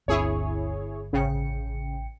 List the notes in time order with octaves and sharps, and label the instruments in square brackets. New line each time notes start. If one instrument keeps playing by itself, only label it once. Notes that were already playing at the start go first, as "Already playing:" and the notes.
[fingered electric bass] G1 C4 D4 [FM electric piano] D2 [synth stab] E4 G#4 C#5
[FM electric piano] A1 G5 C#7 [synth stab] C#3